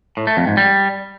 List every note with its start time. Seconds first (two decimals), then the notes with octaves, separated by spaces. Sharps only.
0.17 A2
0.27 A3
0.37 F2
0.47 G#2
0.57 G3